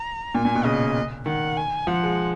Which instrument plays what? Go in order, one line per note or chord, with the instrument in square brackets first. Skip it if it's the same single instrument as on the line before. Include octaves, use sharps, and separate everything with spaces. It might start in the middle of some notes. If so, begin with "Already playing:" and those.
Already playing: [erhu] A#5
[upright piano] A#2 [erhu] G#5
[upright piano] A#2
B2
[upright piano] C#3 [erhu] D#5
[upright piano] D#3 [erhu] F#5
[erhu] G#5
[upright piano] F3 [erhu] F#5
[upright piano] G#3